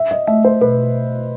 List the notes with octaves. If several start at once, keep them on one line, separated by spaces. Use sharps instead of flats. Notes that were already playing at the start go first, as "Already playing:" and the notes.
Already playing: E5
D#5
A3 E5
C5
B2 B4
B2